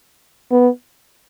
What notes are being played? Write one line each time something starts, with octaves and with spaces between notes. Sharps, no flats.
B3